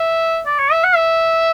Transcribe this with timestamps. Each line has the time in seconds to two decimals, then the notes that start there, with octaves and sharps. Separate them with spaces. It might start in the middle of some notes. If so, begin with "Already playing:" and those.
Already playing: E5
0.46 D5
0.59 C#5
0.72 E5
0.84 F#5
0.95 E5